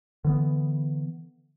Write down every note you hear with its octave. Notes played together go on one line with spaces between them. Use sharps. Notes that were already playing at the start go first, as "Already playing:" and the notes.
D3 E3 B3